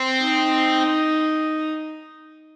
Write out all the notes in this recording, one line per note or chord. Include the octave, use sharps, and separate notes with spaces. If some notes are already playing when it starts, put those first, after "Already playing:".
Already playing: C4
D#4